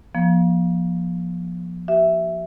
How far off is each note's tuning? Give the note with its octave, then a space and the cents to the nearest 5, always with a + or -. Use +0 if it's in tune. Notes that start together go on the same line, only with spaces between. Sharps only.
F3 +0 A#3 +45
G4 -35 E5 +0